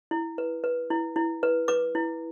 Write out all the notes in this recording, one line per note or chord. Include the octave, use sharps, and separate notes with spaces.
E4
B4
B4
E4
E4
B4
B4 D6
E4